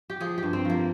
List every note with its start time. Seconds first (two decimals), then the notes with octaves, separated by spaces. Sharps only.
0.10 G4
0.20 F3 G#4
0.38 G2 G4
0.53 C4
0.65 F3 A#3